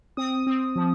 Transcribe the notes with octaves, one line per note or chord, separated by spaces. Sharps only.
C4 D#6
C4
F3